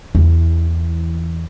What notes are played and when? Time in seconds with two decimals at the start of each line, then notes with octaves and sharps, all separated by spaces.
0.15 E2 E3